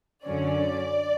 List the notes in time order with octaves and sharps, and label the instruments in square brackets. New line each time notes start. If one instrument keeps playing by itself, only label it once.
[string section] F#2 D3 F#3 C#4 D5